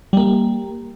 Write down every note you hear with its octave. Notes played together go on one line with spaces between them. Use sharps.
G3 A#3